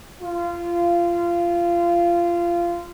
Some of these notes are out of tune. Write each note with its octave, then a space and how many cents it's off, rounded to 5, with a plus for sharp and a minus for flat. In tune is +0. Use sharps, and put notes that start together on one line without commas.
F4 -20